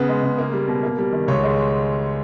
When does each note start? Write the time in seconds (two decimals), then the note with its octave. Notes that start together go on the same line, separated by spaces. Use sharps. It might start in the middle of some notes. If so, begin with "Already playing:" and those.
Already playing: C#3 B3
0.09 G#3
0.23 C#3
0.38 A#3
0.53 G3
0.68 B2
0.83 A#3
0.98 G3
1.13 D#3
1.28 C#2 C#5
1.43 G#3